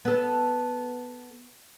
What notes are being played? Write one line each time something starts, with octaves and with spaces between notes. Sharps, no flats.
B3 A4